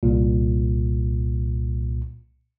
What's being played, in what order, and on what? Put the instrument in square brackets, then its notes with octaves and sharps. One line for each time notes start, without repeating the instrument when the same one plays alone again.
[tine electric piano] C2 A#2